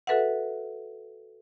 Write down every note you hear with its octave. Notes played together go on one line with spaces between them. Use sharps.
F#4 A4 B4 E5 F#5